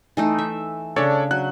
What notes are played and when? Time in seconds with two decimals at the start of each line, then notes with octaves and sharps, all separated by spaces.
0.17 E3 A3 D#4
0.38 E5
0.96 C#3 D4 A4 C#5 D5
1.31 F#3 F#6